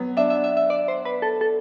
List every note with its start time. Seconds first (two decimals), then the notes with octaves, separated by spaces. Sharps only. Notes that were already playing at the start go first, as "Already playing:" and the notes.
Already playing: F#3 B3
0.17 D4 E5
0.30 E5
0.44 E5
0.57 E5
0.70 D5
0.88 C5
1.05 B4
1.22 A4
1.41 A4